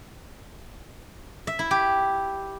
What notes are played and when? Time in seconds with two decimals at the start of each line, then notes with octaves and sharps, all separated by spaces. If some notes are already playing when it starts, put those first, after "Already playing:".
1.47 E5
1.59 E4
1.71 G4